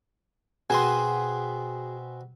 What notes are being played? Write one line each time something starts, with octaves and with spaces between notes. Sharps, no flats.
B2 B3 C4 F#4 G#4 G#5 C6